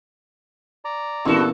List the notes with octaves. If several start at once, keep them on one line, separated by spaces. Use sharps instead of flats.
D5 A#5
E2 G2 A#2 C4 C#4 E4 F#4 A4